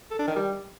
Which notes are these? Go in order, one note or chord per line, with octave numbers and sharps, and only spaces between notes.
A4
D4
D#3
G3